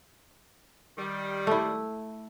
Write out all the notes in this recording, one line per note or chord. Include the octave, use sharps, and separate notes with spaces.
D#3 G3
A3 E4